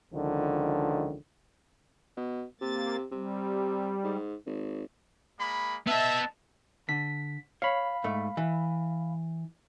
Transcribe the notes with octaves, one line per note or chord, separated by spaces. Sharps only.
C#2 D3 D#3 F3
B2
C3 A#3 A6
C3 G3
G#2
G#1
G#3 A#3 B5
B3 D#5 E5 A5
D3 B6
C#5 F5 B5
G#2 A3
E3